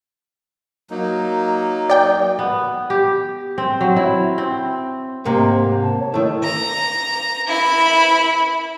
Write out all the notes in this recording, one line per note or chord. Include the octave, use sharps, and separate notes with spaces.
F#3 A#3 D#4
D5 G5
B3
G4
C4
F#3
E4
C4
G#2 C3 A#3 C5
A5
C#5
D#3 A3 E4
A#5
E4 B5